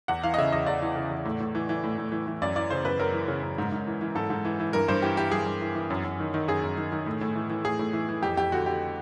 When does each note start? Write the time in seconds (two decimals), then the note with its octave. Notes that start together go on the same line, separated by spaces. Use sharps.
0.08 E2 F#5
0.23 E3 F5
0.34 D#5
0.38 C#3 E5
0.52 E2 D#5
0.66 E2 D5
0.82 E3
0.96 C#3
1.11 E2
1.25 A2
1.40 A2
1.55 E3
1.69 E3
1.84 A2
1.98 A2
2.12 E3
2.27 E3
2.42 F#2 D5
2.56 E3 D5
2.70 C#3 C5
2.84 F#2 B4
2.99 F#2 A#4
3.13 E3
3.28 C#3
3.43 F#2
3.58 G#2
3.72 G#2
3.87 E3
4.01 E3
4.15 G#2 A4
4.30 G#2
4.45 E3
4.60 E3
4.73 G2 A#4
4.88 G2 C5
5.02 E3 G4
5.17 E3 G4
5.31 G2 G#4
5.46 G2
5.61 E3
5.75 E3
5.90 F#2
6.04 F#2
6.20 D#3
6.34 D#3
6.48 F#2 G#4
6.63 F#2
6.78 D#3
6.92 D#3
7.06 A2
7.21 A2
7.35 E3
7.50 E3
7.65 A2 G#4
7.79 A2
7.93 E3
8.09 E3
8.22 F2 G4
8.37 F2 G4
8.52 D3 F#4
8.66 D3 G4